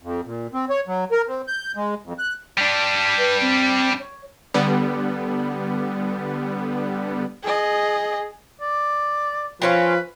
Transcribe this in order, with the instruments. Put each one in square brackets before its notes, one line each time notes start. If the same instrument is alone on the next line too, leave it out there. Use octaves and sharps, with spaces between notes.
[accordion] F2
A#2
C4
C#5
F#3
A#4
C4
G6
G#3
F2
F#6
[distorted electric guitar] G3 D4
[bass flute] B4
C4
C#5
[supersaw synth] D3 G3 B3
[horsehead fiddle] G#4 D#5
[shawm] D5
[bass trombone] F3 [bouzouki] C4 C#4 F4 [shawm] B4